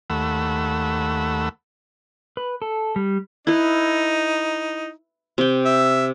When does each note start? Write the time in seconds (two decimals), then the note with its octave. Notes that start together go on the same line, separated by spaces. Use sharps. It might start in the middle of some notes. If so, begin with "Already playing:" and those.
0.10 D#2 A3 F#5 B5 E6
2.37 B4
2.62 A4
2.96 G3
3.47 D#4 E4 B4
5.38 C3 G5
5.65 E5